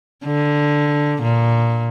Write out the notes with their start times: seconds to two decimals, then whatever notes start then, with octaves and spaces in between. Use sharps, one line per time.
0.25 D3
1.22 A#2